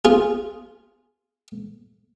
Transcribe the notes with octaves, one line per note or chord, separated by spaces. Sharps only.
F4 G#4